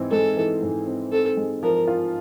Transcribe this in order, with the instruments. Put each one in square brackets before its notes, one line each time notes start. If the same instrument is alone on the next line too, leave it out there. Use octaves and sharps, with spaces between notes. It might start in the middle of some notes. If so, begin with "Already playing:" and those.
Already playing: [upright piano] G#2 E3 C4
[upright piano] G#3 [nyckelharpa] A4
[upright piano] E3
G#2
C4
[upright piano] C4 [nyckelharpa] A4
[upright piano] G#3
[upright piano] F3 [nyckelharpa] A#4
[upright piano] F4